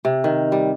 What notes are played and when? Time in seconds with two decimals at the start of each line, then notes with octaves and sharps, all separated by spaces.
0.05 C3
0.24 D#3
0.52 G3